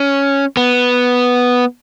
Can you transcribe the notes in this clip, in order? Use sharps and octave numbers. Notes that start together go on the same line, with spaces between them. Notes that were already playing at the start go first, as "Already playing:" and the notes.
Already playing: C#4
B3